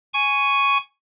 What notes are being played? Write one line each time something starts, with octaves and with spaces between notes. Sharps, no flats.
G#5 C#6